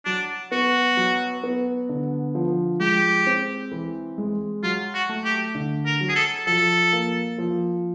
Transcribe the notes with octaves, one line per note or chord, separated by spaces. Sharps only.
F#3 D4
B3 F#4
F#3
B3
D3
F3
G#3 G4
C4
E3
G#3
F#3 F4
F#4
A3
G4
D3
A#4
F#3
G#4
A4
F3 A4
A#3
F3